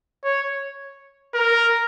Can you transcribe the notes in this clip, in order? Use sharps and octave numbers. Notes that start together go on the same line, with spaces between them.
C#5
A#4